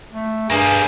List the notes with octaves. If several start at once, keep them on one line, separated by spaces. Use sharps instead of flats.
A3
G2 G3 A#3 G#4